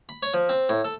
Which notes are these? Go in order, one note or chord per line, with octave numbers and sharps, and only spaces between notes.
B5
C#5
F3
C4
A2
A4